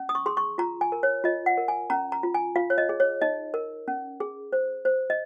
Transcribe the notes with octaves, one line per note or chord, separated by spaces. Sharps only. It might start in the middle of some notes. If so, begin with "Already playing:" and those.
Already playing: C#4
D#6
C#6
G#4 C6
C#6
F4 A#5
G#5
A#4
C#5
F4 D#5
F#5
A#4
G#5
C#4 A#5
A#5
F4
G#5
F4 F5
C#5
D#5
G#4
C#5
D#4 D#5
A#4
C#4
G#4
C5
C5
D#5